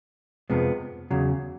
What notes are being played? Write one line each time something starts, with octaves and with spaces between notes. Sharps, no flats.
F2 C3 F3 G#3 B3
E2 C#3 F#3